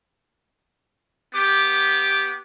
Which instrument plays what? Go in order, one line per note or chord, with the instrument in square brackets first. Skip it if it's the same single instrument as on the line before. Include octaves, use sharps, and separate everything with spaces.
[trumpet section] B3 G4 D6